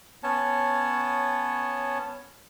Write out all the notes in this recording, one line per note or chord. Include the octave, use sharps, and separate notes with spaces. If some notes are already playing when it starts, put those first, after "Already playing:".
B3 C#4 C#5 A5